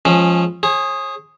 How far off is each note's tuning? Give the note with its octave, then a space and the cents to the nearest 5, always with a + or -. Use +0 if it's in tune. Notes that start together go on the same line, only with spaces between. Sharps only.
F3 +0 G#3 +0 C#4 -20
G#4 +0 C#5 -45